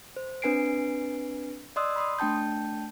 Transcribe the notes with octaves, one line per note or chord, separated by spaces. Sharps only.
C5
C4 D4 B4 G#5 C7 D7
D5 D#5 C6 D#6 E6 F#6
B5 C6 D#6
A3 D4 G5 A5 G6